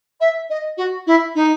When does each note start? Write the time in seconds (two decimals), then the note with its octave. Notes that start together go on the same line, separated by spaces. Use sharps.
0.20 E5
0.49 D#5
0.77 F#4
1.06 E4
1.35 D#4